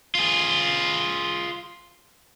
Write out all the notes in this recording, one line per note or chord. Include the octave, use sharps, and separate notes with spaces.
F4 G#4